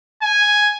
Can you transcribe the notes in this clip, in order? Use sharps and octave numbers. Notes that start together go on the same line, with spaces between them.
G#5